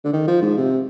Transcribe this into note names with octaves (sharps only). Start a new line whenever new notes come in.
D3
D#3
F3
G#2
C3